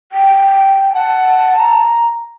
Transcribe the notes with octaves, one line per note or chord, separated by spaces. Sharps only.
G5
F#5 A5
A#5